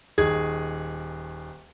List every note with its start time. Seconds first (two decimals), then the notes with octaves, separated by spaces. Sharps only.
0.18 D#1 D#3 G#4 G#6